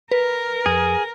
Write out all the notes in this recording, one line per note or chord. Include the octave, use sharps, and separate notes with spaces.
A#4 B4
F2 G#4